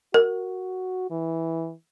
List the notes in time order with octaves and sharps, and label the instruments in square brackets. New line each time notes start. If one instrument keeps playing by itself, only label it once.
[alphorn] F#4 [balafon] A#4
[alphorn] E3